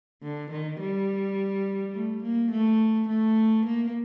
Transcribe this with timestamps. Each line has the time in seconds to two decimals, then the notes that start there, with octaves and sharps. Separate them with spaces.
0.23 D3
0.51 D#3
0.80 G3
1.94 A3
2.23 A#3
2.51 A3
3.08 A3
3.66 A#3